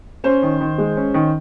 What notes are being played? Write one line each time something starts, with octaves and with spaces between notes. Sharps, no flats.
C#4 C5
D#3
D#3
G#3
C#4
D#3